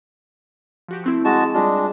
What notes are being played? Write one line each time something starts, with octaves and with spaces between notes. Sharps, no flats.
F3 F#4 G4
A3 C4 E4
G#3 F#4 A5
G3 G#3 D4 F4